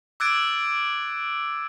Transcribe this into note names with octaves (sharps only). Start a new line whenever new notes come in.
D6 E6 F#6 G#6 A6 D7